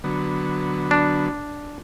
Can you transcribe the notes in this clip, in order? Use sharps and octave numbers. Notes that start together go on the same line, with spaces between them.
D3 F#3 B3
D4